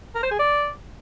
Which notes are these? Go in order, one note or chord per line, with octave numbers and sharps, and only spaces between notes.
A#4
C5
G#4
D5